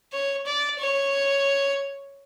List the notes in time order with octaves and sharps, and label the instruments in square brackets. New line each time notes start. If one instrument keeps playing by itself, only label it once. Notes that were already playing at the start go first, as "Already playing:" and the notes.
[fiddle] C#5
D5
C#5